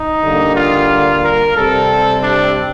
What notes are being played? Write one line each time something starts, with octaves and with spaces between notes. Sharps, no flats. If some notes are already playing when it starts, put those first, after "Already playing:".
Already playing: D#4
D3 G3 A#3
F4
A#4
C3 G3 C4 A4
D4